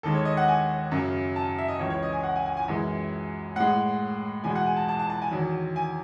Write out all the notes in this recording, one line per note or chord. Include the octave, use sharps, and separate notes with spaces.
D#2 D#3 G#3 A4
C#5
D#5
F#5
G#5
F#2 C#3 F#3
A5
E5
D#5
C#2 C#3 E3 C#5
C#5
D#5
G#5
F#5
G#5
G#5
G#5
F#2 E3 G#3
A2 G#3 F#5
E2 B2 G#3 G#5
F#5
G#5
A5
A5
A5
A5
G#5
E2 D#3 F#3
G#5